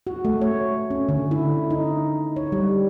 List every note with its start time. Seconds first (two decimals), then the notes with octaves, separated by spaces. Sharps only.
0.07 F#4
0.25 A3
0.41 C#5
0.90 C#4
1.09 D3
1.31 E4
1.71 D#4
2.36 C#5
2.52 G3